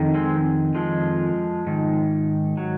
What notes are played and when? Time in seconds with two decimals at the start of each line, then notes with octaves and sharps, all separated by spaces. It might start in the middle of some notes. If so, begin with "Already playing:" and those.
Already playing: F2 D#3
0.14 G#3 C4
0.75 F3 G#3
1.67 G#2 D#3
2.57 F#3